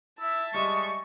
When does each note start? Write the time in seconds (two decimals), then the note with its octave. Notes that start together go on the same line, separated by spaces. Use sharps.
0.20 E4 E5 A5
0.54 G3 G#3 D#5 C#6